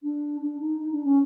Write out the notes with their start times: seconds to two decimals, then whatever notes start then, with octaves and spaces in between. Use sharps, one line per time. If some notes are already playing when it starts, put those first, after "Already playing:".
0.03 D4
0.41 D4
0.60 D#4
0.79 D#4
0.91 D4
1.04 C#4